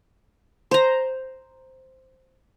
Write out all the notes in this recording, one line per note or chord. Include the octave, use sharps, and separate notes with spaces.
C5 A#5